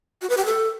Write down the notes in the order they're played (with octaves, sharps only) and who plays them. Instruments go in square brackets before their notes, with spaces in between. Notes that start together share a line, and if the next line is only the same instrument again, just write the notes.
[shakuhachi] F#4
B4
G4
A4